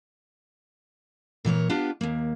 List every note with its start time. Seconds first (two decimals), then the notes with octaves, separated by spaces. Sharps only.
1.45 A#2 E3 A#4 C#5
1.69 B3 D4 F4 G4
2.01 D#2 A#3